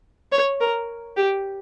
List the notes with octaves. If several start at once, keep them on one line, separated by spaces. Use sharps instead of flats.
C#5
A#4
G4